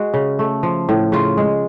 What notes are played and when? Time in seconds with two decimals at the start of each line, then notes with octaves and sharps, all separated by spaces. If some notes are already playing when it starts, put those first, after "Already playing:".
Already playing: G#3 F#4
0.14 C#3
0.39 A3
0.63 F3
0.89 A2
1.12 C#3 F4
1.37 G#3